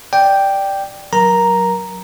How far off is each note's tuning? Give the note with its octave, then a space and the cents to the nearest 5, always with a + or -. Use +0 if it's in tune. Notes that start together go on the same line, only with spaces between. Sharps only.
D5 +0 G5 +0
F#3 +0 A#4 +20 A#5 +0